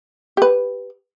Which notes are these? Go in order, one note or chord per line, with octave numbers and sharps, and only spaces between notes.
G4 B4